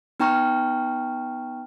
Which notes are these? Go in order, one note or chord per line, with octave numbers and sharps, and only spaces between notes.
B3 D#4 G5 A#5 C#6 F6